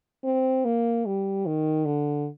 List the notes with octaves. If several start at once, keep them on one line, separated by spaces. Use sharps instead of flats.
C4
A#3
G3
D#3
D3